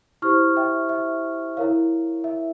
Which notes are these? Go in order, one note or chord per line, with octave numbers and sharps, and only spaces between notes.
E4 G4 C5 C#6 F6
E5 G5
E5
E4 A#4 C#5 F5
E5